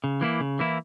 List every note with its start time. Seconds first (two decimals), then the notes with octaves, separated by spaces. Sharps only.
0.04 C#3
0.21 E3 A#3 E4
0.41 C#3
0.59 E3 A#3 E4